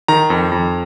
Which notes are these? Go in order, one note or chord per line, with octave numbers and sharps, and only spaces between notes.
D#3 A#5
F2
F2